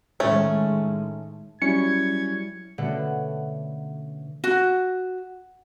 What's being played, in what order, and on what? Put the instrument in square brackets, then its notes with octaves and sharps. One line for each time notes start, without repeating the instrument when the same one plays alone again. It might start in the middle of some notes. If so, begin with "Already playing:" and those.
[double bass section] A2 D#3 G#3 [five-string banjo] A3 C#4
[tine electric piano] F#3 G3 E4 [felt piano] C#4 [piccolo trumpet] G#6 [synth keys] C#7
[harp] B2 D3 A3 C#4 A4 F#5
[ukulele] F#4